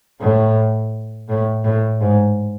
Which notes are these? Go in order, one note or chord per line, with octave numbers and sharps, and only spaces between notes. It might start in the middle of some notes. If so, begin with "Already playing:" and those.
A2
A2
A2
G#2